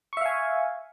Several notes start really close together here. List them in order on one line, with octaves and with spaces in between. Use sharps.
C#6 E5 F5 G#5